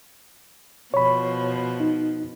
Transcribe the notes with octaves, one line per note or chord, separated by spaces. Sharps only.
B2 F3 C#5 B5
D#4